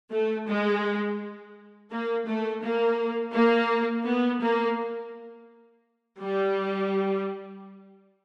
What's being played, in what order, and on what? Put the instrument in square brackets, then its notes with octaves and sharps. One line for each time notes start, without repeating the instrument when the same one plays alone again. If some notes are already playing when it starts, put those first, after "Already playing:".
[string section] A3
G#3
A#3
A3
A#3
A#3
B3
A#3
G3